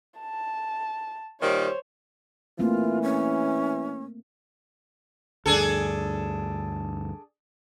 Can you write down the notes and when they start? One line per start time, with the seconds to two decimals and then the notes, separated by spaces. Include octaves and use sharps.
0.20 A5
1.42 A#2 D#3 G3 C5 C#5
2.59 E3 A3 A#3 C4 F4
3.03 C#4
5.46 D2 G2 D4 G#4 A4